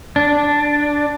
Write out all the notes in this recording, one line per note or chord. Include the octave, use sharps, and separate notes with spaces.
D4